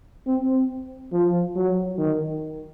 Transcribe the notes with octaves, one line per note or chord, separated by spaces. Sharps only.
C4
F3
F#3
D#3